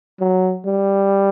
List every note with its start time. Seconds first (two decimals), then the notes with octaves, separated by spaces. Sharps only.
0.20 F#3
0.66 G3